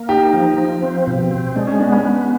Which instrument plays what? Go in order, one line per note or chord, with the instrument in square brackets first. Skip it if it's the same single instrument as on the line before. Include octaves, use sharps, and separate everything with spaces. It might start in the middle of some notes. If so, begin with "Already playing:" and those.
Already playing: [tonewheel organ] A#3
[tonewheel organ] D#4 [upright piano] G4
[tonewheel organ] F3
F3
C4
B2
C4
[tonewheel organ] G#3 [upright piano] D4
[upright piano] C#4
[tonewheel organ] B3 [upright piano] D4
[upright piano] C#4
[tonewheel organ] B3